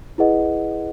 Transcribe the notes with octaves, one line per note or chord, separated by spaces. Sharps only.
E4 G#4 B4 D#5 F#5